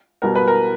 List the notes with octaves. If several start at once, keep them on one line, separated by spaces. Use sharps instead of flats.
B2 G3 B3 A#4
B4
A#4